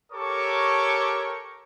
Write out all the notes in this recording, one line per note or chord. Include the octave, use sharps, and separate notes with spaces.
G4 A4 A#4 C#5 C#6 D6